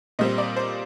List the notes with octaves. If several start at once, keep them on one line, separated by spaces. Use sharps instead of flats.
A#2 G3 C4 D#5
D5
C5